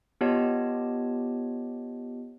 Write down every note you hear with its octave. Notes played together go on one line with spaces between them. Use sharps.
B3 F4 G4 C#5 D#5 A5